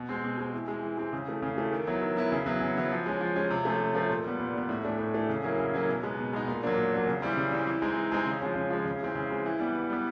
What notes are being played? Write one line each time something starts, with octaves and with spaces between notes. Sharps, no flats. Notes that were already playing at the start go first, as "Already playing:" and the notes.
Already playing: B2
G#3 C4
B2
G#3 C4
E3
G#3 C4
E3
G#3 C4
C#3
E3 A3
C#3
E3 A3
D#3
F#3 B3 E4
D#3
F#3 B3 E4
C#3
F#3 B3 E4
C#3
F#3 B3 E4
F3
G#3 C#4
F3
G#3 C#4
C3
F3 A3 C#4
C3
F3 A3 C#4
A#2
G3 B3
A#2
G3 B3
A2
E3 A3 D4
A2
E3 A3 D4
C#3
F#3 A#3 C#4 E4
C#3
F#3 A#3 C#4 E4
B2
G#3 B3 D#4
B2
G#3 B3 D#4
A#2
F#3 A#3 D4
A#2
F#3 A#3 D4
C#3
E3 G3 C4
C#3
E3 G3 C4
E3
G#3 C4 D#4
E3
G#3 C4 D#4
C#3
F3 G#3 C#4
C#3
F3 G#3 C#4
C#3
E3 G#3 C4
C#3
E3 G#3 C4
E3
G3 B3
E3
G3 B3